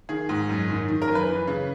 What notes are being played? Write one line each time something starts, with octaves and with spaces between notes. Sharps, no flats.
D#3 G#4
G#2
F#2
D#3
D#3
A#4
F#2
B4
E3
C#3